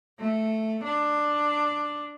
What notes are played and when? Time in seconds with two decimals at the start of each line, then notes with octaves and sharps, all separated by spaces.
0.19 A3
0.83 D4